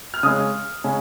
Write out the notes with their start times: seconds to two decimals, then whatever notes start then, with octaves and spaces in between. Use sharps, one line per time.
0.14 F6
0.23 C#3 G#3 C#4 D#6
0.84 C#3 G#3 C#4